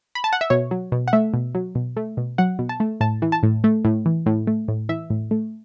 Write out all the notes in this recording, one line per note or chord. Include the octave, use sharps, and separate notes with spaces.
B5
A5
F#5
E5
B2 C#5
F#3
B2
F#5
A3 E5
B2
F#3
B2
A3
B2
F#3 F#5
B2
A5
A3
A2 A5
E3
A5
A2
A3
A2
E3
A2
A3
A2
E3 E5
A2
A3